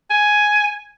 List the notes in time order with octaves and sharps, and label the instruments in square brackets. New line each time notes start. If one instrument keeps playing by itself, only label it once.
[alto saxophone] G#5